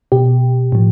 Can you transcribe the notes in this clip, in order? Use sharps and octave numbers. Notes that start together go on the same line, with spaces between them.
B2 G4
A2 F3